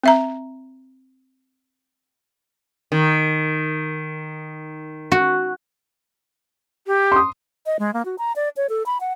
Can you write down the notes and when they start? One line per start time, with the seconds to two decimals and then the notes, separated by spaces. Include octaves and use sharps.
0.04 C4 E5 A#5
2.92 D#3
5.12 F#4
6.87 G4
7.12 C6 D#6
7.65 D#5
7.79 G#3
7.94 A#3
8.05 F#4
8.18 A#5
8.36 D5
8.56 C#5
8.69 A4
8.86 B5
9.00 F#5